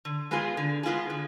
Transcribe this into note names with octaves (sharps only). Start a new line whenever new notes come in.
D3
G#3 B3 F4 G#4
D3
G#3 B3 F4 G#4
D3